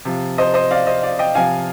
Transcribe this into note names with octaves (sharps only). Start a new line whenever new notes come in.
C3 F3
C5 D#5
C5 D#5
D5 F5
C5 D#5
D5 F5
D#5 G5
C3 F3 F5 G#5